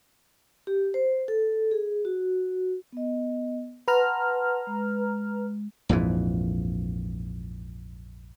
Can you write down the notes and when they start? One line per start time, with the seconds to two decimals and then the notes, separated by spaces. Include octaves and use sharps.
0.67 G4
0.94 C5
1.28 A4
1.71 G#4
2.05 F#4
2.92 B3 D#5
3.88 B4 F#5 A5 A#5 C6 F6
4.67 G#3
5.89 A#1 F2 G#2 E3